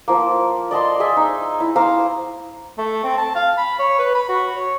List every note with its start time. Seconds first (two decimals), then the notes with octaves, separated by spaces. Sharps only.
0.08 F3 A#3
0.71 D5 D#5 A5 C6
1.00 G#4 D#5 E5
1.17 D#4
1.60 E4
1.76 C5 F5 A#5 D6
2.78 A3
3.04 C4
3.18 A5
3.36 F5
3.57 B5
3.79 C#5
3.99 B4
4.15 B5
4.29 F#4
4.56 C#5